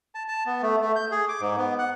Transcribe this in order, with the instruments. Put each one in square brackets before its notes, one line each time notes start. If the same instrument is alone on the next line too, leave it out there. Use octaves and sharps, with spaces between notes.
[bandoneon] A5
A5
B3
A3
A3
G6
G#4
D6
G#2
B3
F#5